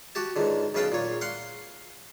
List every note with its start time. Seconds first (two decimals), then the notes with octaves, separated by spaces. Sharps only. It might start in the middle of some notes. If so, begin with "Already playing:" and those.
0.15 F#4 G4 A5
0.36 C#2 G#2 D3
0.75 B1 C#3 B4 F5 G5 A5
0.92 A#2 C#5
1.21 F5 F#5 C6